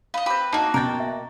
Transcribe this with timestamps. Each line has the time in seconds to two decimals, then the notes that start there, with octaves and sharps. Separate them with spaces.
0.14 B4 D#5 F5
0.26 C4 G4 B4
0.53 A#3 D#4 F#4 A5
0.74 B2 A#4 G5 A6
1.00 E5